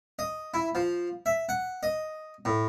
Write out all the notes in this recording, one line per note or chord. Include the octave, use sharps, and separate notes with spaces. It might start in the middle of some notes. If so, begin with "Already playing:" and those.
D#5
E4
F3
E5
F#5
D#5
A2